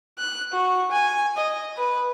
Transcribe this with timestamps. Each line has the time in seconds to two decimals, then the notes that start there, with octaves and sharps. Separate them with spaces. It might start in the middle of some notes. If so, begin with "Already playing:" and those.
0.18 F#6
0.52 F#4
0.92 G#5
1.37 D#5
1.77 B4